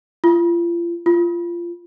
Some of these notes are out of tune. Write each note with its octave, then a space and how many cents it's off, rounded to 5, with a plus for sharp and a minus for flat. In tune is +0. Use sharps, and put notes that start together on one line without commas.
F4 -35
F4 -20